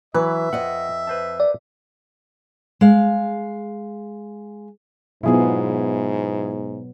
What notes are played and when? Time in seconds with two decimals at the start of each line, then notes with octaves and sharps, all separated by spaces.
0.14 E3 F#3 B4 E5
0.53 F2 D#5 F#5
1.07 B4 C5 A5
1.40 D5
2.81 G#3 F5
5.23 G#2 B2 F#3 B3 E4 F4 G#4